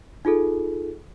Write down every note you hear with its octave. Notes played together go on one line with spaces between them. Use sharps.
D#4 F4 G#4 A4